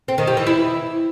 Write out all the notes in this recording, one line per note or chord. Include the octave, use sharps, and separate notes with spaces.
C4
D#3
G3
E3
E4